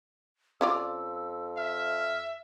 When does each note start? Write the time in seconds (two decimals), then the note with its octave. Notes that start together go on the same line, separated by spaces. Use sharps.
0.61 F2 C#4 F4 D5 E6
1.57 E5 F6